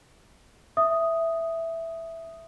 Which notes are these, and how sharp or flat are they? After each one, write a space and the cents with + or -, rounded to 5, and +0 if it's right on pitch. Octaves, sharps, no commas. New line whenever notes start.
E5 +0 D#6 +0